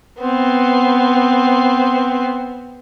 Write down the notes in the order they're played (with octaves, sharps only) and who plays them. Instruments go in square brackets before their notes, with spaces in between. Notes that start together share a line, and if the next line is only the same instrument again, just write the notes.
[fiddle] B3 C4